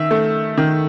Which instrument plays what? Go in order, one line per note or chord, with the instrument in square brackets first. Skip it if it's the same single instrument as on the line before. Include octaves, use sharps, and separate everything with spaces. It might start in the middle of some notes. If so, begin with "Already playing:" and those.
Already playing: [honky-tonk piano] D#3 E5
A3
D#3